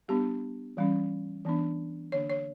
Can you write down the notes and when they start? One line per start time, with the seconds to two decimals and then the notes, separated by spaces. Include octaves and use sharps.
0.08 G3 B3 D4 G4
0.77 E3 G3 C#4
1.45 E3 B3 D4
2.12 D3 A#3 D4 C#5
2.30 C#5